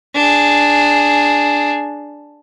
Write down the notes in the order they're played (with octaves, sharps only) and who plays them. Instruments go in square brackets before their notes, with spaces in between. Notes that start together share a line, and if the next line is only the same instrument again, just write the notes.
[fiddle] D4 G#4